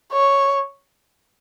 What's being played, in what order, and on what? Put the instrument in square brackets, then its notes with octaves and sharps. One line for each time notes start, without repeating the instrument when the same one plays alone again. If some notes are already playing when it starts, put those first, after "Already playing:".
[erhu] C#5